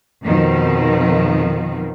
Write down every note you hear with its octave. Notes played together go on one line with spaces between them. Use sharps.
F2 B2 D#3 F3